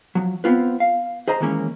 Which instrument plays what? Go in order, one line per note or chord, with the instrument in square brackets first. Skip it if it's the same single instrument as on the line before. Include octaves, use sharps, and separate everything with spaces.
[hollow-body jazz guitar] F3 F#3
B3 C4 F4 B4
F5
G#4 C5 D#5 A#5
D#3 E3 G#3 A#3 C#4 C#5